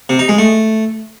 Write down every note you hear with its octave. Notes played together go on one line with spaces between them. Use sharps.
C3
D#4
G#3
A3